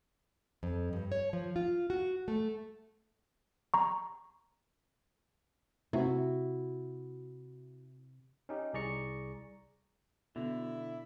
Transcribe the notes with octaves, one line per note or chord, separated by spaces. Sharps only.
F2
G2
C#5
F3
F4
F#4
A3
A#5 C#6
C3 E4 F#4
C#4 D#4 G4
C2 G#4 D5 A#5 C#6 C#7
B2 D3 E4